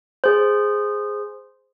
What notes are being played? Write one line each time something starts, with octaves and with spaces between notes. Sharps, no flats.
G#4 C5